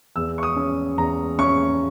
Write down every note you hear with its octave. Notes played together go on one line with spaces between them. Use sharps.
E2 E6
C#6
D#6
C#4
E2 A#5
C#4 C#6